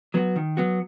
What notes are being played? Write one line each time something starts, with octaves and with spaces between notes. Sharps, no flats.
F#3 B3 F#4
D#3
F#3 B3 F#4